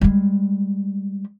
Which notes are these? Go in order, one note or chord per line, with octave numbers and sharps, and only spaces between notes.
G3 G#3